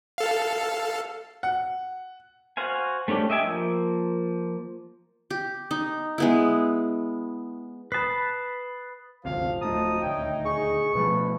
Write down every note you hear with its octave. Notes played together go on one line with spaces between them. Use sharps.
A4 F5
F#5
F#4 C5 F5 G#5
A3 C#4 D4 G4 A4
D#5 E5 G5 G#5
F3 A#3
G4
D#4
G#3 B3 E4
B4 A5 B5 D#6 C7
G1 D2 C3 F3 F5
D1 A3 D#4 A5 A#5 D#6
D#1 D2 C#5 E5 G5
G#4 C#6
B2 F3 A3 B4